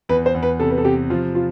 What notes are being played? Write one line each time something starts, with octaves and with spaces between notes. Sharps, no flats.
E2 B4
C5
E2
B4
C3 A4
B4
A4
C3 G4
F3 F4
F4